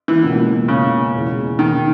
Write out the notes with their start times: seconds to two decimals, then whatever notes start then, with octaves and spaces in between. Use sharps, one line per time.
0.08 E3
0.23 C#2 B2 A#3 C#4 F#4
0.68 C#3
1.14 E2 B2 G#3
1.59 D#3